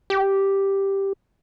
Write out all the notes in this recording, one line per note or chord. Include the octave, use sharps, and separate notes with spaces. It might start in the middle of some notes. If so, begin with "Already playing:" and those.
G4